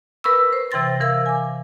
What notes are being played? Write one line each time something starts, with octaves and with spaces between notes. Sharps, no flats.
A#4 B4 B5 C#6 E6
C5
C3 E3 G5 C6 A6 A#6
E3 A#4 F5 E6 G#6
G#5 D6